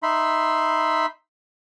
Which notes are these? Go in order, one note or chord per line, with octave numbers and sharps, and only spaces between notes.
D#4 E5 B5 C6